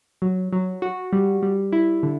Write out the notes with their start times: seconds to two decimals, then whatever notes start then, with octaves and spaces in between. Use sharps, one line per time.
0.22 F#3
0.52 F#3
0.82 F#4
1.13 G3
1.42 G3
1.73 E4
2.03 D3